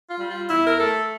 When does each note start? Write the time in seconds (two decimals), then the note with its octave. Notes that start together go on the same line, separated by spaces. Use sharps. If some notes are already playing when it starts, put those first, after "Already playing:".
0.10 F4
0.19 G3
0.30 F4
0.50 E2 E4
0.67 A#4
0.80 A3 A4